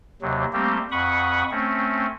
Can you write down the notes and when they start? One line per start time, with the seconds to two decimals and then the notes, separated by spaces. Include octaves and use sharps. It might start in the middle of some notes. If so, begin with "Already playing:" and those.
0.22 D#2 C3 F#3
0.53 G3 A3 A#3 C4 G4
0.91 F2 F#5 B5 C#6 D#6
1.51 A3 C4 C#4